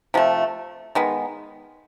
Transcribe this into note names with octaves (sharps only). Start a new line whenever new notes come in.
C3 F3 A3
D#3 G#3 B3